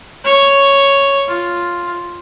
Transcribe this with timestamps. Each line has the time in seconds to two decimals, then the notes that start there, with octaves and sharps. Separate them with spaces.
0.24 C#5
1.27 F4